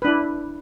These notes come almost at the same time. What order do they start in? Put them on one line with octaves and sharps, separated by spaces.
B4 D4 E4